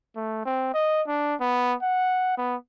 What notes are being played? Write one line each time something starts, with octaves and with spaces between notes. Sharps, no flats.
A3
C4
D#5
D4
B3
F#5
B3